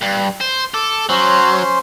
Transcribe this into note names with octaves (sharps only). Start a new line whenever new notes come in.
G2
C5
A4 D6
F#3 C#4 C5 C6